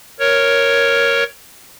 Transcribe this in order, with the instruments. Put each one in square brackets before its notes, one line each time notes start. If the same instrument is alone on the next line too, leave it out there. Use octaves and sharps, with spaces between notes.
[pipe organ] A#4 C#5